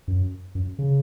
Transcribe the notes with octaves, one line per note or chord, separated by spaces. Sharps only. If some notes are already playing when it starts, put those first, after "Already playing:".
F#2
F#2
C#3